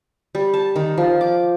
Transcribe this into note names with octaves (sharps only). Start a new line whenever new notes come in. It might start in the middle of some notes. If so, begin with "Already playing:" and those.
G3
A5
D#3
F3
D6